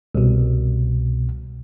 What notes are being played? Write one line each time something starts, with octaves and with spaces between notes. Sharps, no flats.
C2 B2